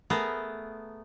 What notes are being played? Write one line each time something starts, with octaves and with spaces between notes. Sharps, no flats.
A3 B3 G#4 A#4